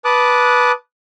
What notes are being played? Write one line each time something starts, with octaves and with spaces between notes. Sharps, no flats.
B4 A5 D6 D#6 F#6